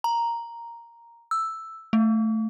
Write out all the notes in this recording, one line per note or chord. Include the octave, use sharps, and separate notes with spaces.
A#5
E6
A3